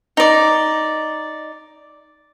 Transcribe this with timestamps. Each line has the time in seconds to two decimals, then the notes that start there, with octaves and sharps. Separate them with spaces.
0.17 D#4 D5